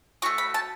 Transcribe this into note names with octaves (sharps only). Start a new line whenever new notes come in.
A3 C#4 F#4 C#6
B5
A5